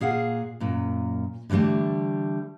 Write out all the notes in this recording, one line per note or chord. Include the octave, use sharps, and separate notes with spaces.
A#2 G#4 F5 F#5
F#2 A#2
D3 E3 F#3 G3 A3